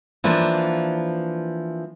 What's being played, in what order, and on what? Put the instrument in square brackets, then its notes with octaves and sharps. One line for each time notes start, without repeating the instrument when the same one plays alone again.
[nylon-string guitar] E3 F3 A#3 D4